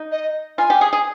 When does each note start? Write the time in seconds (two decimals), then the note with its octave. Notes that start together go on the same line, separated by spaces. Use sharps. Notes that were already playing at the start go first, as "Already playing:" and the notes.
Already playing: D#4
0.12 D#5
0.58 F4 G#5
0.70 G4
0.81 G#4
0.93 G#4